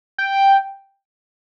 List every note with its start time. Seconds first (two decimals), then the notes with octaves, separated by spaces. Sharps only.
0.18 G5